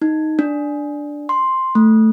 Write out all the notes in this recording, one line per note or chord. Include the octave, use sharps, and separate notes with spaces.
D#4
D4
C6
A3